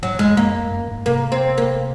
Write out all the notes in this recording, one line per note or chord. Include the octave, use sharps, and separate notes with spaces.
G#2 F#3
F2 G#3
F2
F#2 A#3
F2
F#2
G#2
C3 A#3
C4
A#3